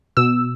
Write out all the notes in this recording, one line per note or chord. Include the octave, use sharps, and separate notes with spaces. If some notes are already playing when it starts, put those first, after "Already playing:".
B2 E6